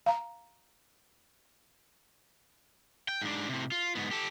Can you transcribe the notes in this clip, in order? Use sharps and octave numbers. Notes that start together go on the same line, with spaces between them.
F5 A#5
G5
G#2 D4
A2 C3
F4
G#2 B3
G4 A4